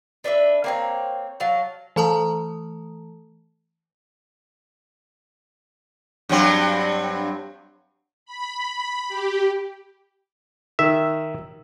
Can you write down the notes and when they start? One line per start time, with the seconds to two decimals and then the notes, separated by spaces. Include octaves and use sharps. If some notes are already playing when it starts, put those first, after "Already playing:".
0.24 D4 B4 D5 E5
0.64 A#3 C4 C#5
1.40 F#3 F5 A5
1.96 E3 A3 A4 A5 A#5 D#6
6.29 G2 F#3 C4
8.26 B5
9.09 G4
10.79 D#3 E5